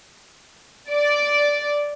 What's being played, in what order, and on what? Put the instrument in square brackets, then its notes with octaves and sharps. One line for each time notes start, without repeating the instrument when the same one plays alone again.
[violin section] D5